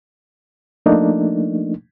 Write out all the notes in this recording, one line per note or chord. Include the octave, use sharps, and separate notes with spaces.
F3 A3 A#3 D4 D#4